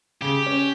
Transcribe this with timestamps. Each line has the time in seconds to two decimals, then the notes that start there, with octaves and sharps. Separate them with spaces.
0.21 C#3 G4
0.46 C#4